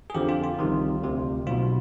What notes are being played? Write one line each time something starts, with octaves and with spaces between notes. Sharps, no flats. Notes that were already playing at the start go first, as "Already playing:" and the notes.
G#4
F2 D3 F3 G4
F4
F4
C2 C3 D#3
D2 C3 F3
B1 B2 F4